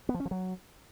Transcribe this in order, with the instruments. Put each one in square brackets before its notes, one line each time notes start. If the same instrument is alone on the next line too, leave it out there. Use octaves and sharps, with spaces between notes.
[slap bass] B3
F3
C#4
F3
F#3